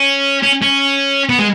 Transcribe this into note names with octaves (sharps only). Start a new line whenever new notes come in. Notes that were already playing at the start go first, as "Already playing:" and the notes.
Already playing: C#4
C#4
C#4
B3
G#3